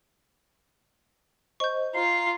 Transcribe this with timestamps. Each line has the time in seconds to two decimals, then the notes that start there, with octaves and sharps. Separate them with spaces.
1.60 C5 D#5 C#6 G6
1.95 F4 A#5 C7